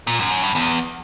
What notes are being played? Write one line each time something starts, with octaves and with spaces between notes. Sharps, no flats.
A#2
F#2
F#2
G2
E2